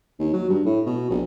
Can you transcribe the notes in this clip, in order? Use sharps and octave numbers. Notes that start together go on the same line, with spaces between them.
D#2
F#3
G2
A2
B2
A#1